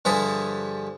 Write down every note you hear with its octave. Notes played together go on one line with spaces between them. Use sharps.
G2 D3 F3 G#4 E5